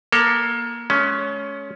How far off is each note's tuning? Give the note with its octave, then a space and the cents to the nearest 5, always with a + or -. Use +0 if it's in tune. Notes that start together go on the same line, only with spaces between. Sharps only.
A#3 +20 A4 +35
G#3 +40 C#4 +10